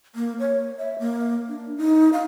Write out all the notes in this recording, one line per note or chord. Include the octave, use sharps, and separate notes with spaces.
A#3
C#5
E5
A#3
D4
D#4
F5